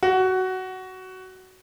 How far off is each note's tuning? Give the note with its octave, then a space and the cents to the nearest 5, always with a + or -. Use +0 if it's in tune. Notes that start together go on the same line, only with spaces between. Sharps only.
F#4 +15